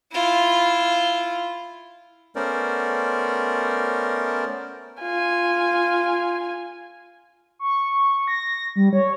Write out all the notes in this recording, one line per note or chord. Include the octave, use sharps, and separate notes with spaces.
E4 F4
A3 B3 C#4 A#4 C5 D5
F4 G#5
C#6
A#6
G3
C#5